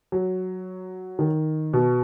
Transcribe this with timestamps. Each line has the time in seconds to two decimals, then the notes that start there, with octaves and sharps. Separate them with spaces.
0.12 F#3
1.19 D#3
1.73 B2